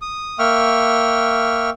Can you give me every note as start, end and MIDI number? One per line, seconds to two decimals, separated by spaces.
0.02 0.38 87
0.39 1.70 58
0.39 1.70 76
0.39 1.70 79
0.39 1.70 85
0.39 1.70 89